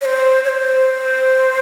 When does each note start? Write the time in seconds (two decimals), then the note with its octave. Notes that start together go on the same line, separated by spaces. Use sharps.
0.01 C#5
0.05 C5
0.44 C#5
0.49 C5